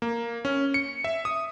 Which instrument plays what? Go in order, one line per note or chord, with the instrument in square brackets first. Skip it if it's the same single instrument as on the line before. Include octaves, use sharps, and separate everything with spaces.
[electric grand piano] A#3
C#4
C#7
E5
D#6